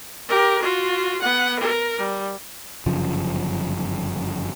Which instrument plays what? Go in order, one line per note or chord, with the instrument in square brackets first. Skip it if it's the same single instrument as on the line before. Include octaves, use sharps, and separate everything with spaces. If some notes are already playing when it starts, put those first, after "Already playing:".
[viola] G4 A#4
F4 F#4
B3 F#5
A#4
G3
[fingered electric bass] G1 F#2 C#3 F3